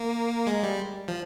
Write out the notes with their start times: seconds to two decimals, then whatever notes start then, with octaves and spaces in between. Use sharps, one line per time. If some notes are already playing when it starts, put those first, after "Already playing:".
Already playing: A#3
0.47 G#3
0.63 G3
1.08 F3